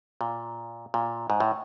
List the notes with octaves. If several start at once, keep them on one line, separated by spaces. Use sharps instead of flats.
A#2
A#2
G#2
A2